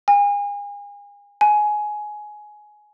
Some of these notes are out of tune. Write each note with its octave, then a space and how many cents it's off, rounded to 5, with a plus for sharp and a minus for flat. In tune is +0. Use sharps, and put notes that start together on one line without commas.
G#5 -35
G#5 +15